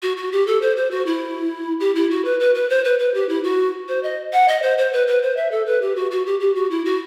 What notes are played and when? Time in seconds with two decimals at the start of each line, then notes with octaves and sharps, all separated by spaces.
0.03 F#4
0.17 F#4
0.32 G4
0.47 A4
0.62 C5
0.77 C5
0.91 F#4
1.06 E4
1.80 G4
1.95 E4
2.11 F#4
2.25 B4
2.40 B4
2.55 B4
2.70 C5
2.84 B4
2.99 B4
3.14 G4
3.29 E4
3.44 F#4
3.88 C5
4.03 D#5
4.33 F#5
4.48 D#5
4.62 C5
4.78 C5
4.93 B4
5.07 B4
5.23 C5
5.37 E5
5.52 A4
5.66 B4
5.82 G4
5.96 F#4
6.11 F#4
6.26 G4
6.40 G4
6.55 F#4
6.71 E4
6.85 F#4